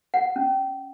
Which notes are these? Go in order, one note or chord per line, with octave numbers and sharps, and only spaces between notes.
F#5
C#4